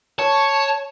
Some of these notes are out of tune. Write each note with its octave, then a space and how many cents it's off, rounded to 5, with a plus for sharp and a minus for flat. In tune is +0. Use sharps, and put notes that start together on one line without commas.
C#5 +0 A5 +0